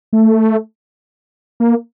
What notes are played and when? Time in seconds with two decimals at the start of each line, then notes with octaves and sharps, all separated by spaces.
0.13 A3
1.60 A#3